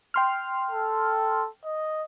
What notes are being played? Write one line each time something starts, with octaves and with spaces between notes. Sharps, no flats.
G5 C6 F6
A4
D#5